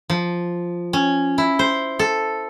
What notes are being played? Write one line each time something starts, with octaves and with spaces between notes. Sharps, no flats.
F3
C#4
E4
C5
A4